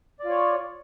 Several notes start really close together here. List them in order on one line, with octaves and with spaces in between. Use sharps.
D5 F4 C#5